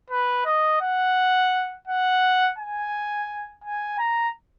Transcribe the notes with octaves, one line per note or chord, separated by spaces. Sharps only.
B4
D#5
F#5
F#5
G#5
G#5
A#5